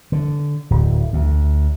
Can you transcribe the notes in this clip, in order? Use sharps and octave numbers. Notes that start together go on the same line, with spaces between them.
D3
D1
D2